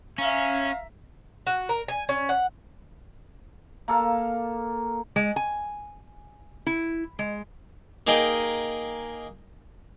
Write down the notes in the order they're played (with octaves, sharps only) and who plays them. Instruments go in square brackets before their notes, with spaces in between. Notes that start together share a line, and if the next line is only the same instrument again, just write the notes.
[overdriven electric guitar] C#4 [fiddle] E5 A#5 [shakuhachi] F5
[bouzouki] F#4
A#4
G#5
C#4
F#5
[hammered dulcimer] A#3 A4 F5
[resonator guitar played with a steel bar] G#3
G#5
E4
G#3
[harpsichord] A#3 D#4 G#4 A#4 D#5 G5